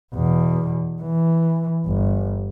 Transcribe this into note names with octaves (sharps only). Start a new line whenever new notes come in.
E2 B2
E3
G1